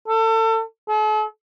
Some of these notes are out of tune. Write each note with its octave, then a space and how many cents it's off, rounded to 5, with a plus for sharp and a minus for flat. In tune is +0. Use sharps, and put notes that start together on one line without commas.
A4 +30
A4 -45